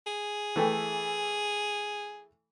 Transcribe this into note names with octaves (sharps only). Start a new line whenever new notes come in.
G#4
E3 A3 G5